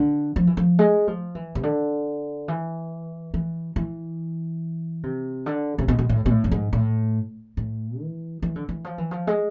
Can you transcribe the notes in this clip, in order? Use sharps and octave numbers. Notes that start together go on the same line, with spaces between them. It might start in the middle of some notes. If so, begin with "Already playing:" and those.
Already playing: D3
F3
E3
F3
G#3
F3
E3
C3
D3
E3
E3
E3
C3
D3
C3
B2
B2
A2
B2
A2
F2
G#2
A2
A2
E3
E3
D3
E3
F3
E3
F3
G#3